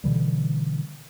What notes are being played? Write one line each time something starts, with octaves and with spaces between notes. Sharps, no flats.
B2 D3 E3 G3